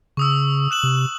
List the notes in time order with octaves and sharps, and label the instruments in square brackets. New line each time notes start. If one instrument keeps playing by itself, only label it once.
[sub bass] C#3 [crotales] C#6 D#6 E6
[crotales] F#6 E7 F#7
[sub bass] C3